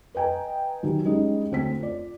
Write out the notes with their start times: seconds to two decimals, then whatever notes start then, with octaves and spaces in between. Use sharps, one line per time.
0.15 B4 D#5 G5 G#5 A#5
0.83 D#3 F#3 G3
1.05 G3 G#3 C#4 D#4
1.51 D2 C4 B6
1.79 F4 D5